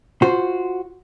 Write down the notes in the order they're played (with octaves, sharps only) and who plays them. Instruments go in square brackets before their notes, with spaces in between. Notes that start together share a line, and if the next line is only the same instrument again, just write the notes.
[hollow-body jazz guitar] F4 F#4 C5